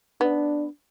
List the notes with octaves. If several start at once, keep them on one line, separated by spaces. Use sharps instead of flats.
B3 D4